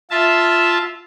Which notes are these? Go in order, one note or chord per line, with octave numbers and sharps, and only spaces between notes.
F4 E5 A5